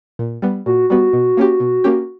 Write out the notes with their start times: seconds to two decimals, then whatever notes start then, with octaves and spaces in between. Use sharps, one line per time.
0.19 A#2
0.42 G3 B3
0.66 A#2 F#4
0.90 G3 B3 F#4
1.13 B2
1.37 A#3 C#4 G4
1.60 B2
1.84 A#3 C#4 G4